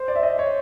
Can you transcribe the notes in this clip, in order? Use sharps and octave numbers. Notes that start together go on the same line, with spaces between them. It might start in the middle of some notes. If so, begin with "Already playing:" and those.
Already playing: C5
D5
E5
D#5
C#5